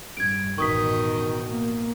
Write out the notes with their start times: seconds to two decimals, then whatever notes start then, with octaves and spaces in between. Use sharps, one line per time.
0.17 G2 G#6 D7
0.58 A1 F#2 B2 D#3 C#6 D#6 B6
1.50 A#3